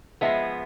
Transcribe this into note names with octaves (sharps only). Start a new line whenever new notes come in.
F3 G#3 B3 E5